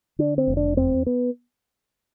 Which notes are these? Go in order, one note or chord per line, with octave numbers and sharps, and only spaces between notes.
D3 D4
C4
F1
D4
E2 C4
B3